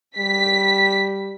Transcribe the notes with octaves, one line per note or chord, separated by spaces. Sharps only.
G3 B6